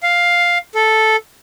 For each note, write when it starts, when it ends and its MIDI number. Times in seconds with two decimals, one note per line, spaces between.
0.03 0.58 77
0.75 1.16 69